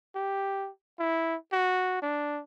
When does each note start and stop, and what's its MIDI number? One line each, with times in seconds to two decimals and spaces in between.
0.16 0.69 67
0.99 1.36 64
1.53 1.98 66
2.02 2.41 62